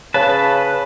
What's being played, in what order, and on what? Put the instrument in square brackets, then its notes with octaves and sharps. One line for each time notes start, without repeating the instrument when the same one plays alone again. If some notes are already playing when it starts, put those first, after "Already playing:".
[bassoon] C#3 [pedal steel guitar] B4 A5